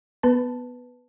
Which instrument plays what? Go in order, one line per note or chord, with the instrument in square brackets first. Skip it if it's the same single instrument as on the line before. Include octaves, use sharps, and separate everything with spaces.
[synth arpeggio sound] B3 B4 A5